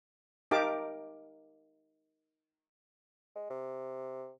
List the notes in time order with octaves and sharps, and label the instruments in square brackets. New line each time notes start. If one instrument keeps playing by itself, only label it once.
[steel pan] D#4 G4 A#4 F5 A5 D6
[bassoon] G#3
C3